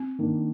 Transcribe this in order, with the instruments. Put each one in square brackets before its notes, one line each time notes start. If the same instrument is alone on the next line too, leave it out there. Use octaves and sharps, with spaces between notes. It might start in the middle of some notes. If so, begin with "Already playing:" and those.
Already playing: [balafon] C4
[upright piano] D#3 A#3 D4